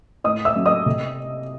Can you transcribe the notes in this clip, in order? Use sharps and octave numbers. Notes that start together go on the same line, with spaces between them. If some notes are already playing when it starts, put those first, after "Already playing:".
A2 D#5 D#6
E5 E6
F#3 C#4
D#5 D#6
C3